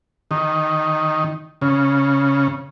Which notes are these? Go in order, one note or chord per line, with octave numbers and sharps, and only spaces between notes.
D#3
C#3